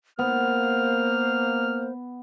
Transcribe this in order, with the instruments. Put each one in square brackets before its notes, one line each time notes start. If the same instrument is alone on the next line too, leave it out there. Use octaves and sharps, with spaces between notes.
[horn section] A#3 [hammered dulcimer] B3 [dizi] C5 [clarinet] F6